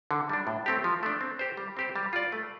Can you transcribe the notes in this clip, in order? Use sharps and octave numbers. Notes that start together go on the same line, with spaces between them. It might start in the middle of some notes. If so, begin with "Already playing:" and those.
D3
G3 D4
A2
A3 C4 G4
F3
A3 D4
C4
G4 C5
G3
C4 G4 C5
G3
F4 D5
A3